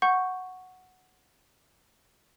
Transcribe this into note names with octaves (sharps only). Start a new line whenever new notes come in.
F#5 C#6 G6